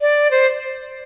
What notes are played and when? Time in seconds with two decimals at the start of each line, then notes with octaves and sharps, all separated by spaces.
0.01 D5
0.31 C5